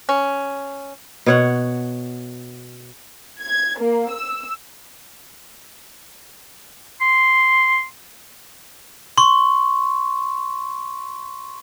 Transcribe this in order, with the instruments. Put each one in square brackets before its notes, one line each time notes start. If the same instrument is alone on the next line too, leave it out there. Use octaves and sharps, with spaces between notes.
[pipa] C#4
[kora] B2 C#5 F#5
[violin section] G#6
A#3
E6
[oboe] C6
[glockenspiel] C6 C#6